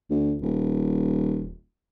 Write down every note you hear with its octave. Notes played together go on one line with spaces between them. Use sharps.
D2
D#1